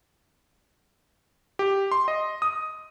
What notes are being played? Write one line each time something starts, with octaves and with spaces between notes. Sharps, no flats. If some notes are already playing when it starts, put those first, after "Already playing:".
G4
C6
D#5
D#6